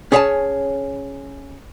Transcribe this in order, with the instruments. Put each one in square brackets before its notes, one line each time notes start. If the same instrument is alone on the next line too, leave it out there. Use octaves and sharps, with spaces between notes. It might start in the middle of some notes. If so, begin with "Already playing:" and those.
[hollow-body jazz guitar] C#4 G#4 C#5 F5 G#5 A5